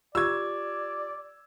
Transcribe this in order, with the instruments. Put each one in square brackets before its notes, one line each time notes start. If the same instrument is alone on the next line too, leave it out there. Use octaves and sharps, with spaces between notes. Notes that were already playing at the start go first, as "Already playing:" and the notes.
[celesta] F4 G4 C#6 [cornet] D5 [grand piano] E6 G#6